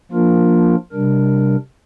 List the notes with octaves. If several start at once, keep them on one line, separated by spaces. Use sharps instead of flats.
F3 A#3 D4 F4 A#4
C3 G3 D4 A#4